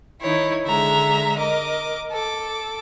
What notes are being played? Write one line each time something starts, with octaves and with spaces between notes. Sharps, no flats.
D#3 D#4 E4 C#5
D3 G#3 E5 A#5
A#4 D#5 D6
A4 D6